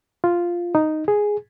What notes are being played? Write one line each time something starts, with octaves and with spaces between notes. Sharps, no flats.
F4
D#4
G#4